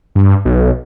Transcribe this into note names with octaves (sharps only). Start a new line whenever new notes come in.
G2
B1